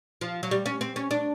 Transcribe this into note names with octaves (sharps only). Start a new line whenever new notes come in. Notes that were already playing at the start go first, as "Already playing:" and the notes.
F3
F#3
G3
C#4
C4
C#4
D4